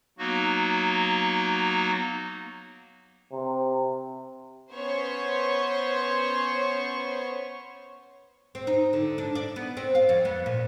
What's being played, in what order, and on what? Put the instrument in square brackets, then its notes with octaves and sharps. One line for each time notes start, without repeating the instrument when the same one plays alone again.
[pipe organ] F#3 A#3 B3 D#4 F#4
[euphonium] C3
[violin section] B3 C#4 C5 C#5 C6 C#6
[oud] C4
D#4
D3
D4
D5
B3
C4
F5
F2
B3
A#2